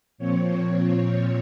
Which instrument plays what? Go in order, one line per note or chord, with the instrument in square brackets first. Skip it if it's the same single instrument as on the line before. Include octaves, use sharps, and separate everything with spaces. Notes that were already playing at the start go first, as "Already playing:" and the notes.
[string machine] A#2 F3 C4 C#5